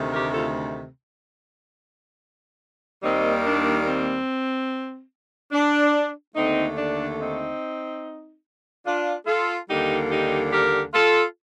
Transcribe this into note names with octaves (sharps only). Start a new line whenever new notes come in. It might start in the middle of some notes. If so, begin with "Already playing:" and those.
Already playing: D2 C3 D#3 A3
G4 A#4
F4 A4
D#2 D#3 G3 A#3 C4 D#4
D4
C4
D4
D#2 D3 A3 C4 D#4
D4
C4 D#4
D4 F4
F4 A4
D#2 D3 G3 A#3 D#4 G4
D#4 G4
G4 A#4
F4 A4